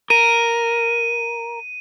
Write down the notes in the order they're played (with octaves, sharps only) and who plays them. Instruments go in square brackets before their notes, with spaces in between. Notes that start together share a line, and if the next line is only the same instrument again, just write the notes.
[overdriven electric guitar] A#4 [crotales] D#7